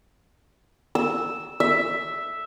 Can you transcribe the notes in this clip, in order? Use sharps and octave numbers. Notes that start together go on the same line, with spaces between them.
E6
E5